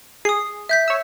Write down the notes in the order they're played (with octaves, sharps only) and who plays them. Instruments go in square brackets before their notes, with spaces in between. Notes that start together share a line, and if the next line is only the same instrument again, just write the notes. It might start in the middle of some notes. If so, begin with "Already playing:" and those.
[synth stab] G#4 [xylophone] D#6 C7
[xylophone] E5 G6 B6
[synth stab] C#5 E6